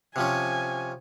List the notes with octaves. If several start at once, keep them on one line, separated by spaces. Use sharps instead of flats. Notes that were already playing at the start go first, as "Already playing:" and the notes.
C3 F3 C#4 G#5